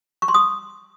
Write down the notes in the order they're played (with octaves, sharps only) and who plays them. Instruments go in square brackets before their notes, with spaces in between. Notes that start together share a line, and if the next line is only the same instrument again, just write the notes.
[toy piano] C#6
C6
D#6